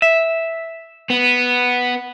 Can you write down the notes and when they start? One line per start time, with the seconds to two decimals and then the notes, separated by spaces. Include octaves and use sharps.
0.02 E5
1.10 B3